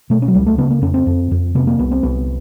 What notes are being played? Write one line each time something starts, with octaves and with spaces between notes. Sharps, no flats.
B2 A3
C#4
F#3
C#2 G3
A3
C#3 B3
A#3
F2 C#4
C4
F2
F2
C3 B3
A#3
C2 B3
C4
C2 B3